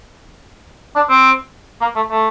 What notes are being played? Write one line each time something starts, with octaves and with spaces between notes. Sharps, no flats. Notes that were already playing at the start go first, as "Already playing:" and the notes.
D4
C4
A#3
A3
A3